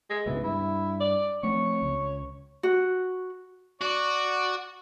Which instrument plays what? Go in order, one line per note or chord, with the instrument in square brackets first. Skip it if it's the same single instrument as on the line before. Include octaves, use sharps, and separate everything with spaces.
[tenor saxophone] G#3
[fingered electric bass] C#2 G#2 B2 [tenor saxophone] E3
[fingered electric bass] G2 [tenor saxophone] E4
[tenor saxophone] D5
[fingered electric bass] F3 A3 C4 [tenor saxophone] C#5
[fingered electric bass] C#2
[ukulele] F#4
[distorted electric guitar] F#4 [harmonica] D5